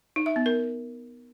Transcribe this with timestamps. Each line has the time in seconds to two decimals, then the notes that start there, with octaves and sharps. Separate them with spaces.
0.16 D#4
0.26 E5
0.36 B3
0.46 A#4